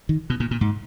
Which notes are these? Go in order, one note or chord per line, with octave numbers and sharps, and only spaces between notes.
D#3
B2
A#2
A#2
G#2